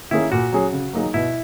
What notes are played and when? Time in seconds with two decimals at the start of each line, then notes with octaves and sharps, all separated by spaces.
0.11 D#3 A#3 C#4 E4 G#4
0.32 A#2 F#4
0.53 F#3 C#4 G#4
0.73 C#3
0.93 F#3 A#3 D#4 G#4
1.14 B2 E4